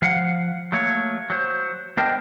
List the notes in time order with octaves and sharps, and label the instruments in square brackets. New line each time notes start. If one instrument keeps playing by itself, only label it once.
[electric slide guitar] F3 F5 F#5
F#3 A3 A#3 C#5
F#3 C5
B3 D4 A#4 C5 D#5 G5